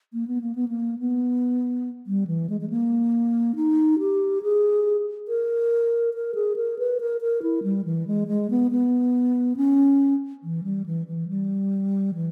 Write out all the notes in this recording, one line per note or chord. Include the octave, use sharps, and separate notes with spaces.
A#3
B3
A#3
B3
A#3
B3
G3
E3
G#3
G#3
A#3
D#4
G4
G#4
A#4
A#4
G#4
A#4
B4
A#4
A#4
E4
G3
E3
G#3
G#3
B3
B3
C#4
E3
G3
E3
E3
G3
E3